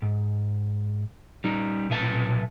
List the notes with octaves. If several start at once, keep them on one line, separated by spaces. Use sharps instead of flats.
G#2
G3 D#4
B1 A#2 B4 E5 A5